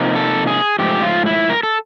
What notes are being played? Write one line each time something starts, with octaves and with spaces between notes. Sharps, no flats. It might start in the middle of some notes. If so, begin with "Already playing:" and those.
Already playing: C3 F3 A#3 D#4
A4
G#4
G#2 F3 A3 G4
F4
E4
A#4
A4